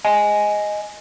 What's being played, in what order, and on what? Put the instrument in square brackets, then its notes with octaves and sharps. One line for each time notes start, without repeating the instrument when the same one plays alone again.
[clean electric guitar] D#5 G#5